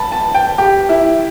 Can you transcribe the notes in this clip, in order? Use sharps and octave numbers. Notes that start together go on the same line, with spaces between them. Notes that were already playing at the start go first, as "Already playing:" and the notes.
Already playing: A5 B5
A5
G5
G4
E4